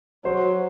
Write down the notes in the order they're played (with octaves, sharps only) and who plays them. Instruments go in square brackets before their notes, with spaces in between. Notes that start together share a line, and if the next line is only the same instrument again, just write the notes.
[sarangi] F#3 [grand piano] C5